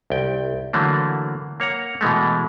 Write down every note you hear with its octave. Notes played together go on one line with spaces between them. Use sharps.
C2 G5
D3 E3 F#3 A3 A#3
A#3 C#5 F#5 A#5
B2 E3 G#3 A3